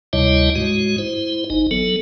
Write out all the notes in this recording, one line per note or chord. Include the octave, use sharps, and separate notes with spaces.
D2 C3 G3 E4 C#5 D#5
G#2 G#3 F#4
E4 C5
G#1 D#4
F#3 B3 A4